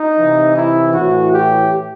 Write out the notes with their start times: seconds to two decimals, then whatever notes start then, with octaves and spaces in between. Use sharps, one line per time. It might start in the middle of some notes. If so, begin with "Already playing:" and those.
Already playing: D#4
0.18 C3 E3
0.56 E4
0.94 A2 E3 F#4
1.32 G4